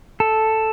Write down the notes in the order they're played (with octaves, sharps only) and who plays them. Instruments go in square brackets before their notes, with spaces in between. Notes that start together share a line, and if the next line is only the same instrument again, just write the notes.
[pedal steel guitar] A4